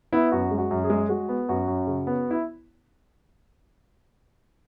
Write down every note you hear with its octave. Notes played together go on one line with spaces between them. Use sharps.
B3 E4
F#2 F#4
G#3
F#4
F#2
G#4
G#3
G#3 F#4
B3
F#2 F#4
F#2
C#3
B3
E4